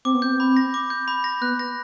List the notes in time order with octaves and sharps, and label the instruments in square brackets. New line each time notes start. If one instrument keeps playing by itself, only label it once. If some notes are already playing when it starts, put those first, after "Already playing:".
[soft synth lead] C4 [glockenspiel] D6
[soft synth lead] B3
[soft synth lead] C4 [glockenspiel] G6
[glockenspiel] B5
A#6
D6
G6
B5
A#6
[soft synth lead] B3 [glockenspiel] F#6
[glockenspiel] A#6